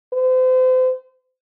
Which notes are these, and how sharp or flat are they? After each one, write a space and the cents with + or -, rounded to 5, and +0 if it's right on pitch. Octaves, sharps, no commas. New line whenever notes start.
C5 -35